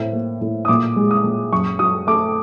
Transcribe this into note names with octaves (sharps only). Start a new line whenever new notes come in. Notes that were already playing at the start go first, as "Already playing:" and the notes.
Already playing: A2 C4
A#3
A2
D#6
A#2 D6
G#3
D#6
A#2
F#2 C#6
F#3 D#6
A3 D6